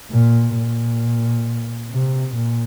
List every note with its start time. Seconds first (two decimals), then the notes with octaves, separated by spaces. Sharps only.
0.11 A#2
0.56 A#2
1.90 C3
2.35 A#2